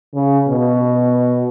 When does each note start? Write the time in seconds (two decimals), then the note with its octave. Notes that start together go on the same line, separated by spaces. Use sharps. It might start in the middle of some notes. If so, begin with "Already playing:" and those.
0.14 C#3
0.48 B2